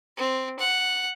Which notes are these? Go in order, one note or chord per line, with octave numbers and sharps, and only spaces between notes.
C4
F#5